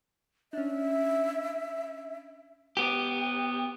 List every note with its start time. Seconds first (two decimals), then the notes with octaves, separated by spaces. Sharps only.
0.53 C#4 D4 E5
2.77 B3 G4